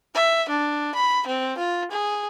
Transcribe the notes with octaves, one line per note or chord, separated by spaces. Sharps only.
E5
D4
B5
C4
F4
G#4